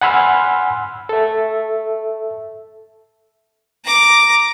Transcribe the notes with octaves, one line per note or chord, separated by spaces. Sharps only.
F#5 G#5 B5 C6 E6 F6
A4 E5
A#5 D6